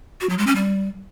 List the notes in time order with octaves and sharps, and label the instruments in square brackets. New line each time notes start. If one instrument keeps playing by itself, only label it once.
[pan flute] F#4
F#3
G#3
C#4
G3